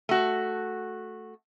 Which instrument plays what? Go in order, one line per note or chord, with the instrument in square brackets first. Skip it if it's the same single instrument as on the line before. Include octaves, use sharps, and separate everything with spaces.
[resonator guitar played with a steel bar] A3 F#4